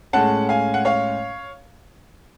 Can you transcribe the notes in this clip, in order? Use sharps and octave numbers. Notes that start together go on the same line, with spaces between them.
A2 G#3 C#4 F#5 A5
F5 G#5
F#5
C#5 F5